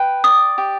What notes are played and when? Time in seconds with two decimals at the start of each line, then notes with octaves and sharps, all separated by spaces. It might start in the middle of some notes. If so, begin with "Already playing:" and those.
Already playing: B4 G5
0.24 D5 D#6
0.58 G4